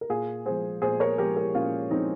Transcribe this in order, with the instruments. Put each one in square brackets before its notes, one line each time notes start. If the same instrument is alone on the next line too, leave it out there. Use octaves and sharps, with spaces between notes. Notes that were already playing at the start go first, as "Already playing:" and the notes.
[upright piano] A#4
A#2 F4 G#4
F3 G#3 G#4 C5
A#2 G#4 C5
A#4 C#5
F3 G#3 G4 A#4
G4 A#4
A#2 C#4 F4
F3 G#3 C4 D#4